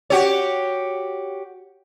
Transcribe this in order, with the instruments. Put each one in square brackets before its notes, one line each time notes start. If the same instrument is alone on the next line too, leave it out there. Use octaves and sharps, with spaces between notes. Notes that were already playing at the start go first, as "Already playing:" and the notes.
[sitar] F#4 G4 C#5